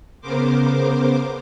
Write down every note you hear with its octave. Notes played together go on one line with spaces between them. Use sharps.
C#3 B3 A#4 C5 D6